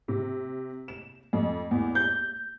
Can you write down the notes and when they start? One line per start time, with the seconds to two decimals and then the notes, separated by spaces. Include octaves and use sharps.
0.08 C3
0.88 E7
1.33 F2
1.71 E2
1.95 G6